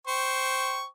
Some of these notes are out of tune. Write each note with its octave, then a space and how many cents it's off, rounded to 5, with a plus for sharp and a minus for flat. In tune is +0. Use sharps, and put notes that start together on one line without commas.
C5 +0 G5 -10 C#6 +0